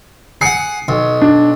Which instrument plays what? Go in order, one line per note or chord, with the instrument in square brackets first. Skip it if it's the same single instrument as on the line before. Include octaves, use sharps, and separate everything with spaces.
[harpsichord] G#4 F#5 [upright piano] C7 C#7
[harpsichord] B1
[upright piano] D4